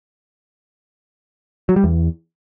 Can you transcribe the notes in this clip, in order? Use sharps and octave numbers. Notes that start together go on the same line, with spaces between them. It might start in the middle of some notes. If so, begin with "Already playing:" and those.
F#3
G3
E2